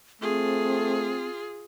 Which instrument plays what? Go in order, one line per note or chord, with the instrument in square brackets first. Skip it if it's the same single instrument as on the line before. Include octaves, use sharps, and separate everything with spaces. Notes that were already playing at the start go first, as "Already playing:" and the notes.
[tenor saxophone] A3 [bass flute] C4 [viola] F4 G#4